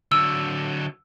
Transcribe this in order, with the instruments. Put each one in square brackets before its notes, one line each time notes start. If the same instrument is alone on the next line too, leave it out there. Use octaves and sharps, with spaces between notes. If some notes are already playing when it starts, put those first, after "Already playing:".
[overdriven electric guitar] D3 F#3 [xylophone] E6